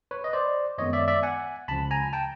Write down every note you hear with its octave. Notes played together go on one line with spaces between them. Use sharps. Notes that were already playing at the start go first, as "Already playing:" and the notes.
B4 C#5
D#5
C5 D5
F#2 D#3 G#3 B3 C#5 D#5
D5 E5
D5 E5
F#5 G#5
C#2 C#3 F3 A5 B5
G#5 A#5
G5 A5